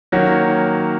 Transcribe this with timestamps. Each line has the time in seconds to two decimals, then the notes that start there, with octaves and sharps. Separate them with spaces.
0.12 D#3 F#3 A#3 C#4 F#4